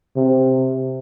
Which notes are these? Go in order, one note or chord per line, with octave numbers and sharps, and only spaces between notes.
C3